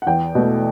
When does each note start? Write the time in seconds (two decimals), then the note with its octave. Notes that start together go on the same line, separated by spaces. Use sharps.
0.02 F#5
0.07 E2 G5
0.35 B2 A3